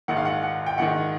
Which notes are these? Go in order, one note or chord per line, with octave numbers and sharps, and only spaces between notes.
A#1 G#2 D#3 F#5
F5
F#5
F#5
G5
A#1 G#2 D#3 F#5